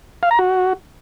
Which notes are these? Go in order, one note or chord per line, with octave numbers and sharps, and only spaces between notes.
F5
A#5
F#4